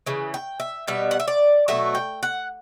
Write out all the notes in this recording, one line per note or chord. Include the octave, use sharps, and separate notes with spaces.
C#3 E3
G5
E5
B2 G3 B3 E5
F#5
E5
D5
B2 F#3 A3 E5
G5
F#5